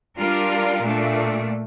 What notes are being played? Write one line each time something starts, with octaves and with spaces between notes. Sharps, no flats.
G3 D4 F4 A#4
A#2 A3 D4